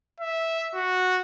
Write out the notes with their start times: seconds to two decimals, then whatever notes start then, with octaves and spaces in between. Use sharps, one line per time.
0.20 E5
0.74 F#4